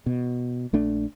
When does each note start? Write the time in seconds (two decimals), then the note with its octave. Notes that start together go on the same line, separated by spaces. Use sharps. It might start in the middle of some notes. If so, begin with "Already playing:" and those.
0.06 B2
0.73 A#1 A3 D4